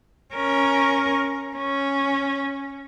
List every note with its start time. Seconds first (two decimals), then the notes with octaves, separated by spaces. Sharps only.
0.34 C#4 A#4
1.56 C#4